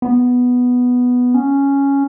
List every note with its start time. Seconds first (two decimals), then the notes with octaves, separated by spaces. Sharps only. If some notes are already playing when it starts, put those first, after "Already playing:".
0.02 B3
1.34 C#4